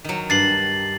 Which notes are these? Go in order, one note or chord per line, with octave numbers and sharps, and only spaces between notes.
D#3 F#3
G2 A6 C7 F#7